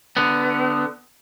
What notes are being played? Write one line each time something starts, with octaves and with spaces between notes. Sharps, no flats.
D3 B3